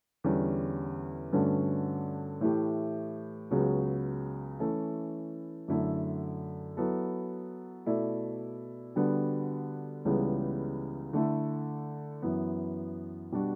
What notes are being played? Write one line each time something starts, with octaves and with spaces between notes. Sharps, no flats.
E2 D3 G3 C#4
G2 D3 A3 C#4 F#4
A2 E3 A3 E4 G4
C#2 C#3 F#3 B3 F#4
E3 A3 C#4 E4 A4
F#2 D3 A3 E4 A4
F#3 B3 E4 A4
B2 A3 E4 A4 D5
D3 G3 B3 D4 F#4
C#2 C#3 E3 G3 B3
D3 A3 E4
F#2 E3 B3
B2 G3 D4 F#4